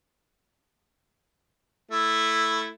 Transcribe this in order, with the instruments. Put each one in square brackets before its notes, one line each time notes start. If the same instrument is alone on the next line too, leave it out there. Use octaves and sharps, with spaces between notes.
[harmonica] A3 E4